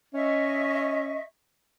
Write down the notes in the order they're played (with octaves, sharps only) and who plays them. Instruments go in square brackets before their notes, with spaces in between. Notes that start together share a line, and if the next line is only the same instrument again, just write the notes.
[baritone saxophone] C#4 [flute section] D#5 E5 C#6